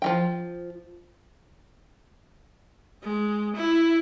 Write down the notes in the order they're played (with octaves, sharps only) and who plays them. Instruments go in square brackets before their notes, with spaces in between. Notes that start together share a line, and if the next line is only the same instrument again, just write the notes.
[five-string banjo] F3 F#3 G5
[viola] G#3
E4